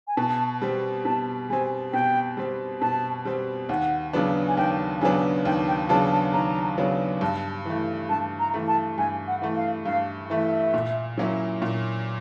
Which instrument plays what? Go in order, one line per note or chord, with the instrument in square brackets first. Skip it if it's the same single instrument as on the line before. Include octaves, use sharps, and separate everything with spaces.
[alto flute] G#5
[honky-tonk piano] B2 [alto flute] A5
[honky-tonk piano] G3 C4
[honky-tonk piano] B2 [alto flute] A5
[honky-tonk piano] G3 C4 [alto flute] G#5
[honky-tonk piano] B2 [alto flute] G5
[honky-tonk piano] G3 C4
[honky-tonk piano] B2 [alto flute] A5
[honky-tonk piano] G3 C4
[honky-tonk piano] D#2 [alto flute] F#5
[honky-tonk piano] C#3 F#3 B3 D4
[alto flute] G#5
[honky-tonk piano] D#2 [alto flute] G5
[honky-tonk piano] C#3 F#3 B3 D4 [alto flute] G#5
[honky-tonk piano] D#2 [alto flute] G5
[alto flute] G5
[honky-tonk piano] C#3 F#3 B3 D4 [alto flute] A5
[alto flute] A5
[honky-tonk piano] D#2 [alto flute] A#5
[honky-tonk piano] C#3 F#3 B3 D4
[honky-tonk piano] G2 [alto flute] A5
[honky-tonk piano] E3 A3
[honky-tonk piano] G2 [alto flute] A5
[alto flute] A#5
[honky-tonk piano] E3 A3
[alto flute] A5
[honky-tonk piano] G2 [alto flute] G#5
[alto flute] F#5
[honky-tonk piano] E3 A3
[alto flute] F5
[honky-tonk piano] G2 [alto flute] F5
[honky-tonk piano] E3 A3 [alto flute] E5
[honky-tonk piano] A#2
F#3 A#3 C#4 E4
A#2